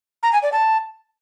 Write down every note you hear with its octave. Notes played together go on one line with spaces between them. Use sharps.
A#5
G#5
D5
A5